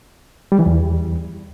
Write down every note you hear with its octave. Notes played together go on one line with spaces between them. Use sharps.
G3
E3
E2